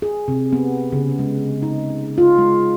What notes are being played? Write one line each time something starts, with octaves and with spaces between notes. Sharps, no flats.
G#4
C3
B3
C#3
G#3
D#4
F4
G#3